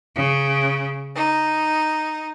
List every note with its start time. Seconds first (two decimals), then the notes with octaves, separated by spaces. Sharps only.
0.15 C#3
1.15 D#4